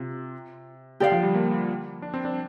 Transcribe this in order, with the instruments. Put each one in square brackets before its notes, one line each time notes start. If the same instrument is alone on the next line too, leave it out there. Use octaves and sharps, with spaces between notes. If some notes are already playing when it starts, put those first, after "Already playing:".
Already playing: [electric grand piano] C3 [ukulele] F4
[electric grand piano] D3 [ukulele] G4 D5 F5
[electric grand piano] F3
G3
A#3
D4
C4
D4